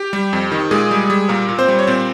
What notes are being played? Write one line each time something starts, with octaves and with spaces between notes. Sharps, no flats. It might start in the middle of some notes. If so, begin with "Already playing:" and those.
Already playing: G4
G3
F2
D#3
A#2 G#3 G#4
G3
G3
A#2 A#3 A#4
A#2
C4 C5
G3
C#5
A#2 C4 C5